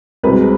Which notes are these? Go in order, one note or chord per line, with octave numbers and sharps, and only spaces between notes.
C2 B2 G#3 C4 B4